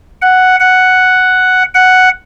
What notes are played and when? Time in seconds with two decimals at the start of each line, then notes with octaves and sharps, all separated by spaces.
0.22 F#5
0.60 F#5
1.74 F#5